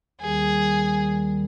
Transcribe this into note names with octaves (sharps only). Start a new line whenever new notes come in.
D#2 D#3 G3 G#4